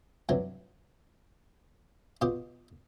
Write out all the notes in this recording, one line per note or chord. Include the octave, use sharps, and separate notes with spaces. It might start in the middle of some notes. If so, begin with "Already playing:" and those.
G2 C3 E3 F#3
B2 F4 G4 D#6